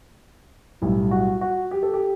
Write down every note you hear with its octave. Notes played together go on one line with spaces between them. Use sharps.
B1 A2 G3 E4
F#4
F#4
G4
A4
G4